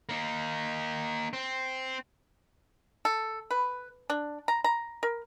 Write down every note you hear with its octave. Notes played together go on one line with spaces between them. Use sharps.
A#3 D#4
C4
A4
B4
D4
A#5
A#5
A#4